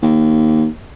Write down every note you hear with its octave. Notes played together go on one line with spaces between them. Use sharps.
D#2